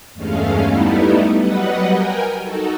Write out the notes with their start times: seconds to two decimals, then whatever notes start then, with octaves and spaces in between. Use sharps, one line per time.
0.14 E2 G2 G#3 A3 C#4 F5
0.60 G3 A3 B3 D#4 E4
1.39 F#3 G3 B4 D#5 F#5
1.91 A#4 G5 G#5
2.39 D#4 F#4 A4